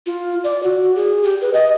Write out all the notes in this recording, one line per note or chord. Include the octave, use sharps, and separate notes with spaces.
F4
D5
F#4
G#4
G4
B4
D#5